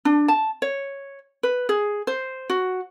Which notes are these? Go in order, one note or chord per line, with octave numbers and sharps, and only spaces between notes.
D4
A5
C#5
B4
G#4
C5
F#4